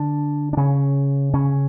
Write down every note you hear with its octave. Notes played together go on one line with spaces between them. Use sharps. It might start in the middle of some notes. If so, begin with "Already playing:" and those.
Already playing: D3 D4
D4
C#3 C#4
C#3 C#4